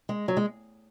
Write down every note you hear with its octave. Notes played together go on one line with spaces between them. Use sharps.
G#3
F#3
G#3